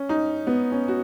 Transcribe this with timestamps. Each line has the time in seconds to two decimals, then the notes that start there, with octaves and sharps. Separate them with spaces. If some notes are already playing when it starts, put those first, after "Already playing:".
Already playing: C#4
0.09 D#4
0.47 B3
0.72 C#4
0.88 F#4